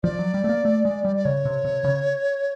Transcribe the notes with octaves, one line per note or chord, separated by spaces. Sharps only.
F3 D5
F#3
G3
A3
A#3
A3
G#3
G3
D5
C#3 C#5
C3
C3
C#3